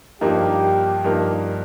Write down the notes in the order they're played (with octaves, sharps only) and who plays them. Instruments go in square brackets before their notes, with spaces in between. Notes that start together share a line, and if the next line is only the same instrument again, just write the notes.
[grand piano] G2 F3 A#3 D#4 A#4 [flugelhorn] G4
[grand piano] G2 F3 A#3 D#4 A#4